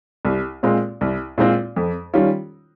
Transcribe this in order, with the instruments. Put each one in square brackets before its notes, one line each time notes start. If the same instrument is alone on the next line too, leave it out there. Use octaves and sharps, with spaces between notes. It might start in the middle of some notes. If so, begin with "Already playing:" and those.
[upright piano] C2
A#2 G#3 C4 F4
C2
A#2 G#3 C4 F4
F2
D#3 G3 C#4 F4